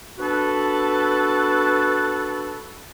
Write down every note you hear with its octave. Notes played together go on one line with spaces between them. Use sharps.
B3 D4 F#4 A4 B4